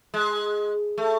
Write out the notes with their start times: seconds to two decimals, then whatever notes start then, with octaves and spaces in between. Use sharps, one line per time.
0.14 G#3
0.98 A3